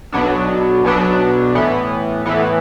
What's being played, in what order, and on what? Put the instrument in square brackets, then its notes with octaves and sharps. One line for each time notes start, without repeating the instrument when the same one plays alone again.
[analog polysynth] B1 B2 F#3 B3 D4
B1 B2 F#3 B3 D4
A2 E3 B3
A2 E3 B3